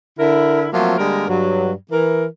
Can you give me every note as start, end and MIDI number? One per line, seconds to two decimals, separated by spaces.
0.19 0.67 50
0.19 0.67 64
0.19 0.67 70
0.73 0.97 53
0.73 0.97 54
0.73 0.97 57
0.73 0.97 58
0.73 0.97 60
0.73 0.97 65
0.98 1.27 50
0.98 1.27 55
0.98 1.27 56
0.98 1.27 58
0.98 1.27 70
1.28 1.72 43
1.28 1.72 54
1.92 2.25 52
1.92 2.25 70